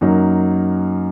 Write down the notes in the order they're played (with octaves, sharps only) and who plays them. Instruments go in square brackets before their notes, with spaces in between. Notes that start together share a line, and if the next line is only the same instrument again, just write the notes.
[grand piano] F#2 F#3 A#3 D#4